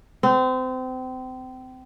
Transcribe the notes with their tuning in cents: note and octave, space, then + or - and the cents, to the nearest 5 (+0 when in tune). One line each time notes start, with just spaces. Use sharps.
C4 -30